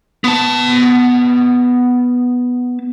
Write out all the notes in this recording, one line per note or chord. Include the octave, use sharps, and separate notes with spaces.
B3 A5